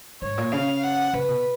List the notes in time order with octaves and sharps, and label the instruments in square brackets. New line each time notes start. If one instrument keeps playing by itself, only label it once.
[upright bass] G#2 [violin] C#5
[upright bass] A#2
[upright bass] C#3 [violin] F5
[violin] F#5
[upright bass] C#3 [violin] B4
[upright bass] B2